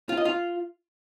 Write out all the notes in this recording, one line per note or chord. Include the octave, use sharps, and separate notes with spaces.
F4
D#5
F4